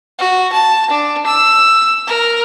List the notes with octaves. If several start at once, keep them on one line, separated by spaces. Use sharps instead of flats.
F#4
A5
D4
E6
A#4